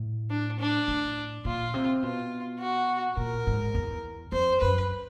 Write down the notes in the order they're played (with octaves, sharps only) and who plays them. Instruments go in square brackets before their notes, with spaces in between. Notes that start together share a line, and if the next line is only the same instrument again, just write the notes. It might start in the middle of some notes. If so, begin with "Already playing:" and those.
Already playing: [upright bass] A2
[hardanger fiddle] D4
D4
[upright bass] A2
[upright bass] A#2 [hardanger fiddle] F4
[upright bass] C3
[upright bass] B2 [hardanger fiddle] F4
[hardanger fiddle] F#4
[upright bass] A#2 [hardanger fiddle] A#4
[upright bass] G#2
E2
[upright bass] F2 [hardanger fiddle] C5
[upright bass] F#2 [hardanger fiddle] B4